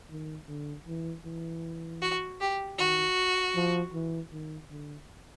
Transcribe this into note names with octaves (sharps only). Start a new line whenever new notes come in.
D#3
D3
E3
E3
F#4
G4
D#3 F#4
F3
E3
D#3
D3